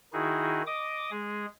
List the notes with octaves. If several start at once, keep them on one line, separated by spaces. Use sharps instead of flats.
D#3 D#4 E4 F#4 G#4
D#5 D6 D#6
G#3 G#4